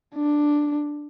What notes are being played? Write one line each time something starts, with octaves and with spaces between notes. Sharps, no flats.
D4